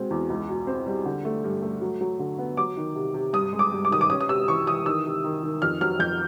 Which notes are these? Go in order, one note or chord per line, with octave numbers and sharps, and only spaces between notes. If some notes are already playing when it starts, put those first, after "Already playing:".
Already playing: B2 G#3 C4
E2
C#2
B2
C4
G3
D3
A3
G2
A3
F#3
F#3
D3
B3
F#3 D6
D#3
C3
C3
G2 D#6
G#3
D6
G2
D6
D#3 D#6
D6
C#4 D#6
D#6
C3 E6
E3 C#6
E3 D#6
D#3 E6
C3
D#3
D#3
F2 F6
F#3 F6
F2 G6